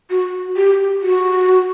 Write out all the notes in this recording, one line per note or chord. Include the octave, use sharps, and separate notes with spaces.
F#4
G4
F#4